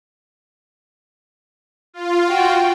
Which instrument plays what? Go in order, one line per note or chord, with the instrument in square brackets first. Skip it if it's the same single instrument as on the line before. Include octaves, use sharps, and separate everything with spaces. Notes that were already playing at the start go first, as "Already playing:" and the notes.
[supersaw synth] F4
[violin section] F#4 G5